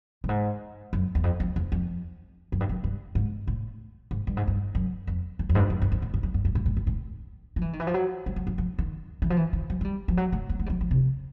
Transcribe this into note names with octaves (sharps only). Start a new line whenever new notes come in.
G2
G#2
F#2
E2
F2
F2
E2
F2
F#2
G2
F#2
G2
G#2
A2
G#2
G2
G#2
G2
F#2
F2
E2
F2
G#2
G2
F2
F#2
F#2
A2
G#2
F#2
G2
G2
A2
A2
G#2
A2
F3
E3
D#3
E3
F3
F#3
G3
F3
F#3
F3
D#3
E3
F3
E3
D#3
F#3
G#3
G3
F3
F#3
A3
A#3
A3
G3
F#3
F3
C3